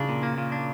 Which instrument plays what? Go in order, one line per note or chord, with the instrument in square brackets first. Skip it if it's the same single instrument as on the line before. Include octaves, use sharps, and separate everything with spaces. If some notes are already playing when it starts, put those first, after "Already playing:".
Already playing: [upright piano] C#3 [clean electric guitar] D4
[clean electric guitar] A#2
A#3
A#2
D4